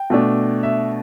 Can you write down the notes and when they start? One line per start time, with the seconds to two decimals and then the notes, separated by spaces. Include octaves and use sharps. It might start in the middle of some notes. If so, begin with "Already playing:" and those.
Already playing: G5
0.10 B2 A3 D4
0.63 E5